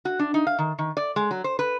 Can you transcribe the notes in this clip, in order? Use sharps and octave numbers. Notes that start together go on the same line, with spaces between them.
F#4
D4
D#4
F5
D#3
D#3
D5
G#3
F#3
C5
B4